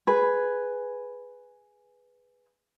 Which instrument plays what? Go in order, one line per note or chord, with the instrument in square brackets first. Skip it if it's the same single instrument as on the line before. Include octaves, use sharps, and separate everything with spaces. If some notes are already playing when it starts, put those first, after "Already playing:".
[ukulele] G#4 B4